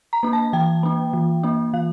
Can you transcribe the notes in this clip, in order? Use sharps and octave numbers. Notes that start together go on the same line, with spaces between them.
A#5
A#3 D4
A5
E3 G5
A#3 D4
E3
A#3 D4
E3 F5